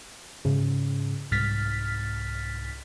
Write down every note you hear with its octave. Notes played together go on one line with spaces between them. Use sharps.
G#2 C#3
C2 G#2 F6 A6 B6